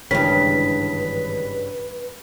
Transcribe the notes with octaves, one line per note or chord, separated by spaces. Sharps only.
G#1 G2 C#3 E3 B4 B6